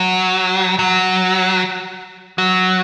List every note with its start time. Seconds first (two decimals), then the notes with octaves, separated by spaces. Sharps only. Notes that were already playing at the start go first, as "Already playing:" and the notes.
Already playing: F#3
0.79 F#3
2.38 F#3